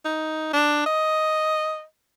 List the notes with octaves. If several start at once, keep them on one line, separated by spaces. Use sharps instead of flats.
D#4
D4
D#5